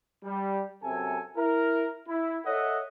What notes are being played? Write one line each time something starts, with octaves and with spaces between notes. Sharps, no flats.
G3
F#2 C3 A4 G#5
E4 A#4
E4
A4 C#5 D#5 E5 F#5